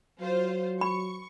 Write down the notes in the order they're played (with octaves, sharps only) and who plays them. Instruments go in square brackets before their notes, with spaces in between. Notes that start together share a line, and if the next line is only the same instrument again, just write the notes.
[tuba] F#3 [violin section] F4 C5
[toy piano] B5 [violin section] C#6